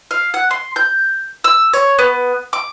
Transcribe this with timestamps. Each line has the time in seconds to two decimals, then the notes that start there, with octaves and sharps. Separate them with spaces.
0.11 F5
0.34 F#5
0.51 C6
0.76 G6
1.44 E6
1.73 C#5
1.99 B3
2.53 D6